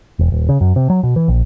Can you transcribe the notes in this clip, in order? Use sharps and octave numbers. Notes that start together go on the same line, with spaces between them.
E1
D#1
C#3
F#2
C3
F#3
B2
E3
A#1